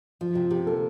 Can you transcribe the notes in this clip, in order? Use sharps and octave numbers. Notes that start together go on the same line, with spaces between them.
F3 F4
C3 F4
C3 G4
A#3 A4